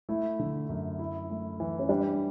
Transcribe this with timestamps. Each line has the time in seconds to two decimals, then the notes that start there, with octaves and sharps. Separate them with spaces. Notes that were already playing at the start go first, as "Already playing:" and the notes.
0.09 A3 E4
0.39 D3
0.69 F#2
0.99 E4
1.30 A3
1.60 E3
1.79 C#4
1.89 G3 D4